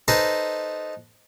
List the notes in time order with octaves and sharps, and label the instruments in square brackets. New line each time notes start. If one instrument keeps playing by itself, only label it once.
[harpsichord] D#4 A4 B4 C5 D#5